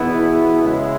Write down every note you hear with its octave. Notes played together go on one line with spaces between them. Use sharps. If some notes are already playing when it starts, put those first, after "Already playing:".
Already playing: E2 B2 B3 E4
C#3 G#3 E4